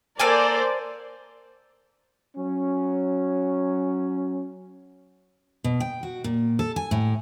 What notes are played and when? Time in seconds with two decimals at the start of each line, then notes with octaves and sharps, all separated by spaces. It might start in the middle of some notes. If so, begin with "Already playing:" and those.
0.19 A#3 A4 A#4 C5 D5 G#5
2.36 F#3 C#4
5.64 B2
5.80 G5
6.03 F#4
6.24 A#2
6.59 A4
6.76 G#5
6.91 A2